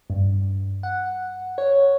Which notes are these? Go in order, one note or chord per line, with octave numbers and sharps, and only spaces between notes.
G2
F#5
C#5